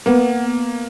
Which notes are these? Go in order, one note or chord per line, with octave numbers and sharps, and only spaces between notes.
A#3 B3